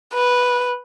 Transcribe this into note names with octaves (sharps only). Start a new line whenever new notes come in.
B4